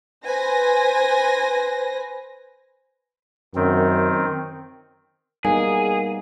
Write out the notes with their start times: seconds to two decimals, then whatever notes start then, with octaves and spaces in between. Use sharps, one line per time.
0.24 B4 C5 G#5 A#6
3.56 F#2 D#3 C4
5.45 G3 A#3 B3 D#4 G#4 G#5